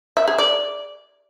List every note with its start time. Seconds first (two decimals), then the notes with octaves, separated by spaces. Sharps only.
0.17 E5
0.28 G#4
0.38 D5